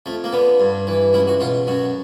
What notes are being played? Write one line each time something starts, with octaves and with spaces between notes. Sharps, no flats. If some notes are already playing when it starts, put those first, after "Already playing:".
F2 A3
A#3
D3 B3
G2
E3
C#2 E4
F#4
B2 F4
F#2 F#4